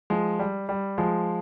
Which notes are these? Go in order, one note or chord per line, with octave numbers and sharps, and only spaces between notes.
F3 G#3
G3
G3
F3 G#3